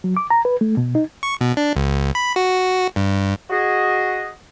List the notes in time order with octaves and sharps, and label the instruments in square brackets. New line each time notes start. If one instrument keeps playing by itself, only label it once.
[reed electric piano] F#3
D6
A#5
B4
A3
B2
D#4
[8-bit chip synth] C#6
B2
D4
C#2
B5
F#4
G2
[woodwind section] F#4 G#4 D#5